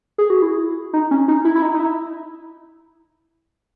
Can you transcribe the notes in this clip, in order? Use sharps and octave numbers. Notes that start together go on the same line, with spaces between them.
G#4
F#4
E4
D#4
C#4
D#4
E4
E4
D#4
D#4
E4